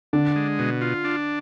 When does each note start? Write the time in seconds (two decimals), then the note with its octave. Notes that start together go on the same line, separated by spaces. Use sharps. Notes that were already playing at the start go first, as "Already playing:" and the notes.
0.13 D3 D4
0.36 G#3
0.59 B2
0.81 F4
1.04 D4